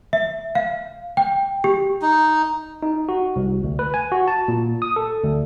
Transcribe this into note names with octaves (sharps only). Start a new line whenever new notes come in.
E5
F5
G5
G4
D#4
D#4
F#4
C2
D2
B4
G#5
F#4
A5
A#2
D#6
A4
D2